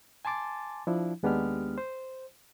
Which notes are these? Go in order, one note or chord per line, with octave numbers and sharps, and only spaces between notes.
G#5 A5 C6 D6 A6
F3 D4 E4
D#2 G#3 B3 D4 G4 F6
C5